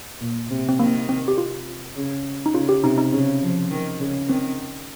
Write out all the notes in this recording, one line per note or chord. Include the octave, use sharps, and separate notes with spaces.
A#2
C3
C4
D#3 A#3
C4
G4
F4
C#3
D#4
C#3 F4
G4
C3 D#4
D#4
C#3
F3
D#3
C#3
D#3 C4